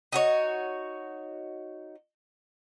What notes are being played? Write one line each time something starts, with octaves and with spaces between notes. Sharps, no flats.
D#4 F#4 C#5